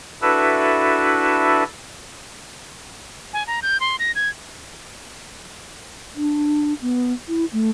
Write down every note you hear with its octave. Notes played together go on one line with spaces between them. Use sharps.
D4 E4 F#4 A4 B4 E5
G#5
A#5
G6
C6
A#6
G#6
D4
B3
E4
A3